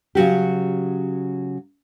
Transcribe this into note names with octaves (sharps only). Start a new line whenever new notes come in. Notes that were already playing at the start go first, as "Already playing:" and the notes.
C#3 F#3 F#4 G4